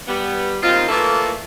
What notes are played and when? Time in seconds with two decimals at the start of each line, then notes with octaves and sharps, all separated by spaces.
0.08 G3 B3
0.62 D#2 C4 D#4 F4
0.89 A#2 E3 A3 A#3 E4 A4